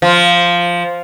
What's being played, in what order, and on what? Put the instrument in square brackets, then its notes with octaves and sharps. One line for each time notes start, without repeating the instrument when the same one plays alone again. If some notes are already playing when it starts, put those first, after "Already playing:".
[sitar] F3